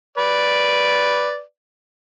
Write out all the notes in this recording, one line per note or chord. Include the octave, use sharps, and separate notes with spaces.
B4 D5